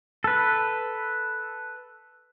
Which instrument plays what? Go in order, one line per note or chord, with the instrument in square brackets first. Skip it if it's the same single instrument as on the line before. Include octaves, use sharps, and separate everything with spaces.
[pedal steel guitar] A4 B4